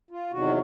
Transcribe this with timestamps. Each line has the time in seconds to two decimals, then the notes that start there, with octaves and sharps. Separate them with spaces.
0.10 F4
0.31 E2 C3 D#3 F#3 F#4